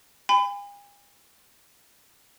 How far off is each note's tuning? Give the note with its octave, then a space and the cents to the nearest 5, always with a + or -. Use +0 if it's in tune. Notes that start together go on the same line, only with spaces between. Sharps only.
G#5 -45 B5 +35